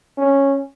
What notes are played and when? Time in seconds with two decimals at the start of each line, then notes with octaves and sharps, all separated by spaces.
0.18 C#4